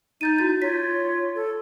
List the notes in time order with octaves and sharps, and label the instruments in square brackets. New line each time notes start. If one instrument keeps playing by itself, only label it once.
[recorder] D#4 [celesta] G6 A6 D#7
[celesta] E4 F#4 A6
[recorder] F4 [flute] C#5 [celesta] B6
[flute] A4